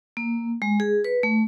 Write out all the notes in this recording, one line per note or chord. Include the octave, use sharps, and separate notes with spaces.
A#3
G#3
G#4
B4
A3